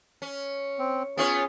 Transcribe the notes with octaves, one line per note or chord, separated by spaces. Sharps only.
C#4
C4
B3 C#4 F4 G#4 C#5